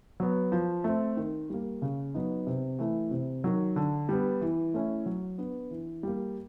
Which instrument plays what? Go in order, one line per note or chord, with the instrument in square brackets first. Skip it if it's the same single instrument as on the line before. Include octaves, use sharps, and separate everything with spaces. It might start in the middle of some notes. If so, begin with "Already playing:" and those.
[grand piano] F#3 B3
F3
A3 C4
D#3
G3 A#3
C#3
F#3 B3 D#4
C3
E3 A3
C3
D#3 F#3
D3
G3 B3
E3
A3 C#4 E4
F#3
B3 D4
E3
G3 A#3